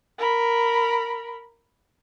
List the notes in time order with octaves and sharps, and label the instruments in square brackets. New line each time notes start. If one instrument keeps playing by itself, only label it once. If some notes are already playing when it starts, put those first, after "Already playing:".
[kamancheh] A#4 B5